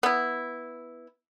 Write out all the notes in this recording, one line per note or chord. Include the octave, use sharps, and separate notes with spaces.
B3 E4